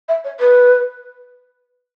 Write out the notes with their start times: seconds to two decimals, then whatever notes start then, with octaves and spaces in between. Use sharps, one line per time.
0.08 E5
0.24 C#5
0.40 B4